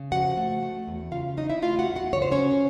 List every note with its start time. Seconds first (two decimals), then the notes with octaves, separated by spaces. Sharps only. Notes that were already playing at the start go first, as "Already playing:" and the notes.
Already playing: C#3
0.12 F3 F#4 F#5
0.37 A3
0.63 A3
0.87 E2
1.12 C#3 F4 F5
1.37 F#3 D#4 D#5
1.50 E4 E5
1.62 A3 F4 F5
1.79 F#4 F#5
1.88 E2
1.96 F#4 F#5
2.13 C#3 C#5
2.22 C5
2.32 C#4 C#5
2.38 F#3